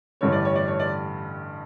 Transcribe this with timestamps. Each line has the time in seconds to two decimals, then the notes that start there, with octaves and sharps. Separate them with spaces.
0.21 A1 G2 D3 C#5
0.32 D5
0.45 C#5
0.56 D5
0.68 C#5
0.79 D5